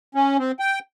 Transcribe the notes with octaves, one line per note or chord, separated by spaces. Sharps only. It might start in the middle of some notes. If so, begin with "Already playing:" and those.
C#4
C4
G5